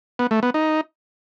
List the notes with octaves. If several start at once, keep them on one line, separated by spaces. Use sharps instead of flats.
B3
A3
B3
D#4